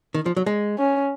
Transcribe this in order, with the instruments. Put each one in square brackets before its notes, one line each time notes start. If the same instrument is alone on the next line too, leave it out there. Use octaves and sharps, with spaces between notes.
[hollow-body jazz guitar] D#3
F3
F#3
G#3
[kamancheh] C#4